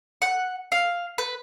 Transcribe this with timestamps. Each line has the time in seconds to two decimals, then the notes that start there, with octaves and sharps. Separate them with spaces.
0.22 F#5
0.72 F5
1.18 B4